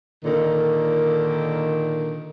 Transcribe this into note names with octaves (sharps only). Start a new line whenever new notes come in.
A#2 D3 D#3